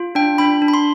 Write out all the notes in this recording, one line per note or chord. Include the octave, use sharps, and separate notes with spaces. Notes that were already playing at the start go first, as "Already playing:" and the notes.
Already playing: F4
D4 G5
D4 B5
D4
B5
C6